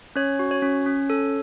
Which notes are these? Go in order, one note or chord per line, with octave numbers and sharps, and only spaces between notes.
C#4 C#5
F#4
C#5
C#4
C#4
A4